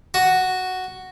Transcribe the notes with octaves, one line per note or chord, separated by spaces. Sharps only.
F#4